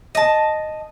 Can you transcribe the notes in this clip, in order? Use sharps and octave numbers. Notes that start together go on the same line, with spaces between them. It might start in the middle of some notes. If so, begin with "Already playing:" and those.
D#5 A5